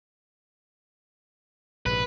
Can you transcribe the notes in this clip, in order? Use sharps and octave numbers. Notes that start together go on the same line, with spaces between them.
A#1 G#2 C3 B4